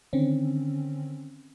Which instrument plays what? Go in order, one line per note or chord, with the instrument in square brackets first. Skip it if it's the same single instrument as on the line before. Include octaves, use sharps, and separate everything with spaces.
[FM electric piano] D3 D#3 C4 C#4